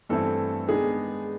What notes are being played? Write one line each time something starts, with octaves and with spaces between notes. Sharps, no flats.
G2 E3 A3 C4 E4 A4
D#3 G#3 B3 D4 G#4